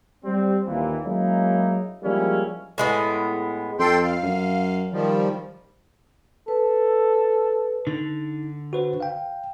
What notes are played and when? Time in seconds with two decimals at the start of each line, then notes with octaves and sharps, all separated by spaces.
0.25 G3 C4
0.66 D#2 A#2 E3
1.04 F#3 G#3 A#3 C#4 D#4 E4
2.04 F3 G3 G#3 A#3 C#4 E4
2.78 A2 G#3 B3
3.79 F2 A4 G5 C6
4.03 F5
4.23 F#2
4.92 D#3 F3 G3
6.48 A4 B4
7.87 D3 D#4
8.73 F#4 B4 C5
9.00 F5 G5